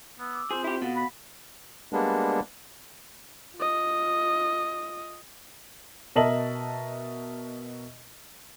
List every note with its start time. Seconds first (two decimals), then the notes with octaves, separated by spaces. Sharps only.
0.19 B3 E6
0.33 D6 E6
0.51 C4 F4 G#4 C5
0.64 E4 G4
0.82 B2 A4 F5 F#5
0.96 B5
1.93 G3 G#3 A#3 B3 D4
3.57 F4 D#5
6.16 B2 A#4 D#5 E5 A5 F#7